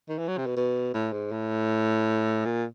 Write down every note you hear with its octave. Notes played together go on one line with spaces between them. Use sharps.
D#3
E3
F#3
C3
B2
B2
A2
G#2
A2
A#2